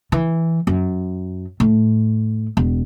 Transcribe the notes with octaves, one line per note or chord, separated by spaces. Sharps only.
E3
F#2
A2
E1